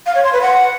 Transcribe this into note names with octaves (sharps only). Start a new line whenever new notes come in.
F5
C#5
C6
B4
F#5